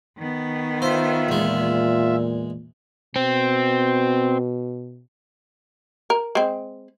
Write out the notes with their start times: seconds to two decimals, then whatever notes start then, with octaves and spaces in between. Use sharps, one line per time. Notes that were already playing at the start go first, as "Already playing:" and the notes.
0.18 D#3 B3
0.82 F4 C5 E5
1.29 E2 A#2 G#3
3.16 B2 C4
6.10 A#4
6.35 G#3 C4